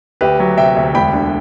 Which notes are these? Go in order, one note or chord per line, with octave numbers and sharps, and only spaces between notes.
D2 G4 B4
F#3
C3 E5 G5
D2
E1 G5 B5
D3